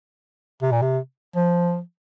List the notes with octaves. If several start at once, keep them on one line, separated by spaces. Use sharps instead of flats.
C3
A#2
C3
F3